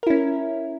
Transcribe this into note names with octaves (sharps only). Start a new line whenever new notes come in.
C#4 E4 A#4